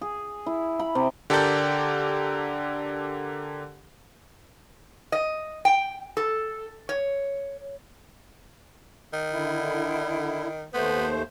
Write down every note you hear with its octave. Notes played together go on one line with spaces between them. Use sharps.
G#4
E4
B5
C3
D3 G4 A4 A#4 D5 G6
D#5
G5
A4
C#5
D#3
D3 E4
D#2 A3 B3 C5